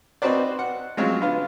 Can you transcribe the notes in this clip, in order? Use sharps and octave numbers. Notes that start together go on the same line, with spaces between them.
C4 D#4 F#4 B4 C5 D5
F#5
F3 F#3 G#3 C4 C#4
D3 B3 F4